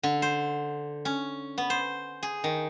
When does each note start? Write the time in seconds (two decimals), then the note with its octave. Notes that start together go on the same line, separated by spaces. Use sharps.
0.03 D3
0.22 C5
1.05 C#4
1.58 B3
1.70 C5
2.23 G#4
2.44 D#3